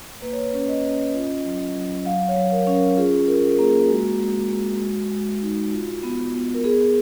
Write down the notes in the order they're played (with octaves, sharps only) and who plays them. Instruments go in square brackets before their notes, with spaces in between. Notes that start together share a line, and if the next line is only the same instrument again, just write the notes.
[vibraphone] A#3 B4
C#5
B4
C#4
D#5
C#4
F4
F#3
F#3
F#3 F5
C#5
F#3
A#4
C#4
A#4
F4 G#4
F4 A#4
A#4
A#3 G#4
G#3 F#4
G#3
G#3
G#3
G#3
D#4
F4
B3
B3
A#4
B3 G#4